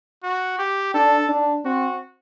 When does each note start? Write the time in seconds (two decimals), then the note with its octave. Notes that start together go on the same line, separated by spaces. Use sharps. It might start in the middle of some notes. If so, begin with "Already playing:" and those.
0.23 F#4
0.59 G4
0.94 D4 A4
1.29 D4
1.65 C4 F#4